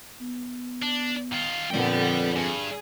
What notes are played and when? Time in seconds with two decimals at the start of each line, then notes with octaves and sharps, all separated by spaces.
0.21 B3
0.82 D4
1.32 D#3 F4
1.70 F2 A#2 D3 B3 D5 G5
2.36 G2 G#4